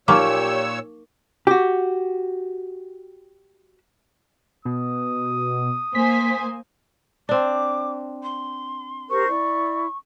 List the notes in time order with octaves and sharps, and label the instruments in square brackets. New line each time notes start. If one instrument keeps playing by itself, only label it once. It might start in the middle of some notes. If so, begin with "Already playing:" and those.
[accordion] A#2 C#5 E6 [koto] A#3 [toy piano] D#4 C#6 D6 [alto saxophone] G4
[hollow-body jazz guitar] F#4 G4
[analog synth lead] B2 [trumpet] D#6
[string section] A#3 C5 G#5 [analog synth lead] B6
[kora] C4 D4 [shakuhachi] D6
[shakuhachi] C6
[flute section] G4 A#4 C5 [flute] C#6
[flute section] E4 [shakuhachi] D5